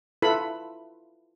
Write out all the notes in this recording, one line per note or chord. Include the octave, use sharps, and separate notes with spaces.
E4 F4 A4 B4 B5